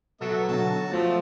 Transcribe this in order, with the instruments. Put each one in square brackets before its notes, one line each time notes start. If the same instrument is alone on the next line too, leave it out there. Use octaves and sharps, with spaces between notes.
[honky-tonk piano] B2 [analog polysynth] F#3 A4 [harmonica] B3 E5
[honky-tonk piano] B1 D3 [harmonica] F#4 A5
[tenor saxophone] F3 [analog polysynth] A3 [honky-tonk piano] A6